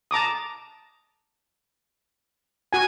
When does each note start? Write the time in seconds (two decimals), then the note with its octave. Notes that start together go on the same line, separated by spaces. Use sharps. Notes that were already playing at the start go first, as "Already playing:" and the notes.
0.11 A5 A#5 D6 D#6
2.73 F#4 G#5